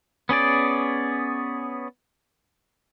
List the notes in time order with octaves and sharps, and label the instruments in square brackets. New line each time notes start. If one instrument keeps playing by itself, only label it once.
[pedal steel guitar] B3 C#4 G#4 D5